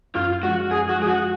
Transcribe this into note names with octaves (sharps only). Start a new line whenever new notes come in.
F#2 F4
F3 G#3 F#4
F#2 G#4
F#4
F3 G#3 G#4
F#4